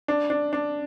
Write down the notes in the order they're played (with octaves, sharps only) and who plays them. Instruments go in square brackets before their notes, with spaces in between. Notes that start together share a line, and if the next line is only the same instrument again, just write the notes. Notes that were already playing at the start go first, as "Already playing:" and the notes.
[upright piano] D4
D4
D4